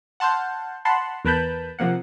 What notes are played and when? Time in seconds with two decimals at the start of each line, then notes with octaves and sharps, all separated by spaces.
0.20 F#5 A5 C6 F6 G6
0.85 F#5 A5 B5 C6
1.25 E2 A#4 B4 A5 B5 G6
1.79 C3 F3 A#3 F#5